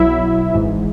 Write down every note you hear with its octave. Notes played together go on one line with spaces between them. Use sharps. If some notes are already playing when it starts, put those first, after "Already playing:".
Already playing: B1 B2 F#3 E4 E5
G#1 G#2 E3